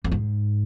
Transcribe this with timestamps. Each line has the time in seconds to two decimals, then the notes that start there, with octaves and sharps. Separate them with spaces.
0.04 F2
0.12 G#2